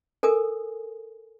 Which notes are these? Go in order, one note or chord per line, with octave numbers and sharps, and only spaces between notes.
A4 A#4 G#5 D#6